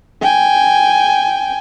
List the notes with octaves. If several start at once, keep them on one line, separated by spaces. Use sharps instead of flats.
G5 G#5